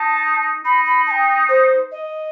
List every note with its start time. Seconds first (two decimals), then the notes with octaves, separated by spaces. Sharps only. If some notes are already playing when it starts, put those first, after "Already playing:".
Already playing: D#4 A5
0.65 D#4 B5
0.86 B5
1.07 A5
1.11 G5
1.49 C5
1.92 D#5